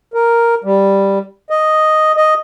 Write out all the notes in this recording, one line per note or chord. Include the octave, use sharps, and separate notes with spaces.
A#4
G3
D#5
D#5